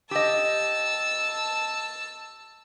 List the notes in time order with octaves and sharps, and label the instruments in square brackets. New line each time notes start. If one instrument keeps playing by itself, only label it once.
[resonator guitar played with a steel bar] G4 D#5 [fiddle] A5 E6